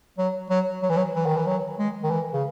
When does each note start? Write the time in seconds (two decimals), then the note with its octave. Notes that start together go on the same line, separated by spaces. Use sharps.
0.18 F#3
0.50 F#3
0.82 F#3
0.90 E3
0.97 F#3
1.15 E3
1.26 D#3
1.37 E3
1.47 F#3
1.79 G#3
2.03 D#3
2.10 E3
2.33 C#3